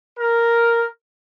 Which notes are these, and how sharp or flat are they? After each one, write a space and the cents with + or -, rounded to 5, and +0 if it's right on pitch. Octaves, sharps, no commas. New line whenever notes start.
A#4 +0